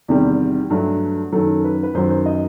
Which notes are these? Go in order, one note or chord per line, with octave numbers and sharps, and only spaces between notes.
E2 C3 D#3 G3
G2 F#3 A3
F#2 D#3 F#3 A4
B4
B4
F#2 D#3 F#3 C5
C5
D#5